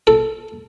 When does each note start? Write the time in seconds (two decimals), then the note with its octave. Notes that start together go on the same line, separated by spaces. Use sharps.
0.07 A4